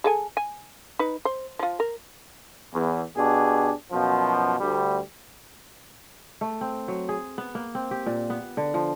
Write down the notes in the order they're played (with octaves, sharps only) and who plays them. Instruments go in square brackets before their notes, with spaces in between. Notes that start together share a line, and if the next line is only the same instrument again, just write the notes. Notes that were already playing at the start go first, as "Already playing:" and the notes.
[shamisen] G#4 A4 G#5
G#5
D#4 B4
C5
F3 F4
A#4
[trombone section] E2
B2 D4 G4 G#4
F#2 B2 F3
D2 G3
[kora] A3
C4
F#3
G#4
B3
A#3
C4
G4
A#2
B3
D3
F3